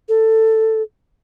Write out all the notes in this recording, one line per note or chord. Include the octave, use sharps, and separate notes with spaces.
A4